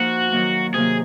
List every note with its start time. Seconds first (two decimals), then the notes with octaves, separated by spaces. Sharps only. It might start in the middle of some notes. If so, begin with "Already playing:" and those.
Already playing: F3 A#3 D#4 F#4
0.32 D#3 F#3 A#3
0.74 C3 D#3 F#3 A#3 G#4